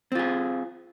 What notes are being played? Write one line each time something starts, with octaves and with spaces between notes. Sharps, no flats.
C4 F4 G#4